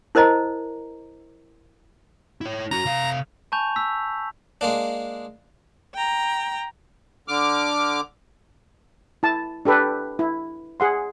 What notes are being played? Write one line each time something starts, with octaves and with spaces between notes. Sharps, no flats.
E4 A#4 C5 D#5 A#5
E4 C#5
C#4 F#4 A#5
C3 F5
G#5 A5 B5 C#6 G6 F7
E6 B6
G#3 A#3 D4
G5 A#5
D3 D6 F6
E4 A5
D4 G4 A4 B4
E4
G#4 F#5 C6